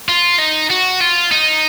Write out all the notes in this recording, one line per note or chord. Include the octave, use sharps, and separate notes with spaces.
F4
D#4
F#4
F4
D#4